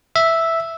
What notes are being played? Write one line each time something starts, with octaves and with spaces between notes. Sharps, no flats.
E5